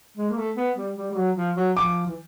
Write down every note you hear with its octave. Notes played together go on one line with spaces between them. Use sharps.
G#3
A#3
A3
B3
G3
G3
G3
F#3
F3
F#3
F3 D6
E3